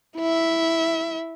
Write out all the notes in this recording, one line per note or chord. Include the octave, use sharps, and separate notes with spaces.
E4 E5